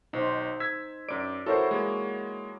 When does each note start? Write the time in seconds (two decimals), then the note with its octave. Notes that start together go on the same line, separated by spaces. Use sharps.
0.13 B1 D#4 C5
0.60 E6 G#6 B6
1.09 F#2 D5 D7
1.46 E4 F#4 A4 A#4 C5 C#5
1.71 G#3 A#3